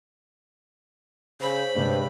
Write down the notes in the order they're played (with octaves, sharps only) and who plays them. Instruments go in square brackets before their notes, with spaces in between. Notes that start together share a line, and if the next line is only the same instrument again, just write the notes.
[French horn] C#3 [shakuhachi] C5 [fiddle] B5
[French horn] G2 [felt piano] C3 G#3 C#5